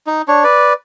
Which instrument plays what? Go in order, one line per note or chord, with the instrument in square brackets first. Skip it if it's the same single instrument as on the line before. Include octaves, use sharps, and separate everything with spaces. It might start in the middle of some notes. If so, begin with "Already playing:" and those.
[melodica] D#4
D4 C#5
B4 D5